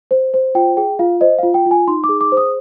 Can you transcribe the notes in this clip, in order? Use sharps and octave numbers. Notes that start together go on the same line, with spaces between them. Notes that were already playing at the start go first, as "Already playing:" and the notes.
C5
C5
F4 G5
G#4 G5
F4 F5
C5 D#5
F4 F5
G5
F4
G#5
D#4 C6
D6
G#4
D6
C5
D#6